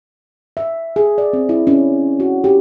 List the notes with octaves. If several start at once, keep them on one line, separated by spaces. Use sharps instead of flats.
E5
G#4
D5
C4
E4
C#4
F#4
G4